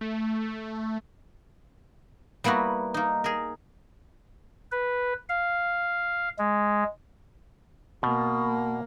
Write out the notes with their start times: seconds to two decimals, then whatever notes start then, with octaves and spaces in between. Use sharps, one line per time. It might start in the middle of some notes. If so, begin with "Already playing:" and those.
0.01 A3
2.44 G3 A#3 B3 E4 F#4
2.94 A#3 D#4
3.24 G#4 A#4
4.72 B4
5.29 F5
6.39 G#3
8.03 B2 A#3